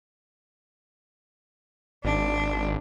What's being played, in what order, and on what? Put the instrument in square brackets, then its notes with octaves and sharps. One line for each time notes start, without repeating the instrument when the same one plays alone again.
[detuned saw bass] G#1 [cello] D4